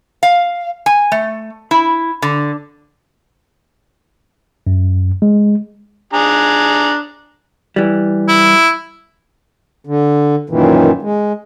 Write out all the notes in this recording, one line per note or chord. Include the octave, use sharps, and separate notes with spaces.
F5
G#5
A3
E4
D3
F#2
G#3
D4 G#4 A#5
E3 G3
E4
D3
F#2 A#2 D#3 E3
G#3